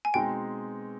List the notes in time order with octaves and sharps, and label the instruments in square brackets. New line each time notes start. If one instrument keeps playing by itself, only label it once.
[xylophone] G#5
[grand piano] B2 G#3 C4 D#4 [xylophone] G5